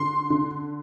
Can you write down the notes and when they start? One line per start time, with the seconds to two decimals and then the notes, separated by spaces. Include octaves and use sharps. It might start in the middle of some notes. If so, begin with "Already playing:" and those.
Already playing: D3 C6
0.30 D3